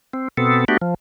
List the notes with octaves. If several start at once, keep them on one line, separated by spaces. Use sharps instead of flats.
C4
B2 B3 C4 A4
A3 B3 D4 F#4 G4
F3